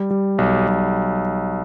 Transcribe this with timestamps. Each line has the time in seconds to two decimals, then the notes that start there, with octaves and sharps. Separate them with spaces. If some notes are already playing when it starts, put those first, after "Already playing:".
Already playing: G3
0.11 G3
0.38 B1
0.68 B1